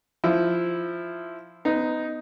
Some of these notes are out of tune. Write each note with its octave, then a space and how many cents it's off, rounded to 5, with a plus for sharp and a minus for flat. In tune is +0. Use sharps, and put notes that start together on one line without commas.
F3 -5 E4 +0
B3 +30 D#4 +0